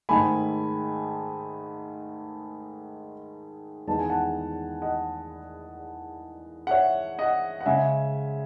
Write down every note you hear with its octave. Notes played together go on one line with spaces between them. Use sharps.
G#2 D#3 A3 G#5 B5
E2 D#3 G#3 B3 D#4 A5
G#5
F#5 A5
D#5 F#5
F#5
C#5 E5
D#5 F#5
F#5
C#3 G#3 C#4 E5 G#5